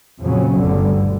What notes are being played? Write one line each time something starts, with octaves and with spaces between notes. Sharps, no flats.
F2 A#2 C#3 F3 F#3 C#4
G1 D2 G2 B2 D3